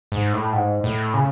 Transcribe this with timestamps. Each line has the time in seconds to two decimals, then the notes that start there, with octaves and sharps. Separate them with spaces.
0.12 G#2
0.33 A2
0.53 G#2
0.84 A2
1.14 C#3